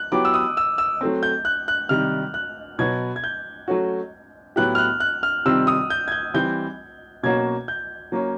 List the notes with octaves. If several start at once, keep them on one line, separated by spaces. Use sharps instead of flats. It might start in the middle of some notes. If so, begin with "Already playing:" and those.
Already playing: F#6
F#3 B3 E4 G4 D6
E6
D#6
E6
E6
F#3 A3 C4
G6
F#6
F#6
C3 D#3 G3 F6
F#6
B2 F#3 B3 G#6
G#6
G6
F#3 A3 C#4 F#4
A2 F#3 B3 E4 G4 F#6
F6
F#6
F#6
F6
C3 D#3 G3 C4 F4 E6
D#6
G6
G#6
G6
E3 G3 C4 G6
B2 F#3 A#3 C#4 F#4 G#6
G6
F#3 A#3 C#4